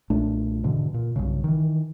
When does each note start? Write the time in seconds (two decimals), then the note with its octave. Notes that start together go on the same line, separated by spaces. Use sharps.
0.10 B1 A#2 A3 D4
0.63 G#2 B2 D3 E3
0.94 A#2
1.16 B1 G2 C#3
1.44 D#3 E3